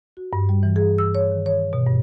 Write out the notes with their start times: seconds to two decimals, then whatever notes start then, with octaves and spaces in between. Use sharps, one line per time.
0.17 F#4
0.33 G2
0.49 G3
0.63 E3
0.76 G#4
0.98 E6
1.15 C#5
1.32 D#3
1.46 C#5
1.73 B2
1.87 G2